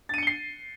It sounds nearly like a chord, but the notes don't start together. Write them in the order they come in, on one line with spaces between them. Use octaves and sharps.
A6 D#7 C#7 G7 C7